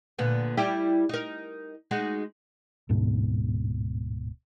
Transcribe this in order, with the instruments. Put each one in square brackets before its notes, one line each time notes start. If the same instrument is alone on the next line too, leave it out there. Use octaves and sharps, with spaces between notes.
[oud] A#2 D3 B3
G3 E4 G4
D#4 A#4
G#3 D#4 F#4
[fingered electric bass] D1 G#2 B2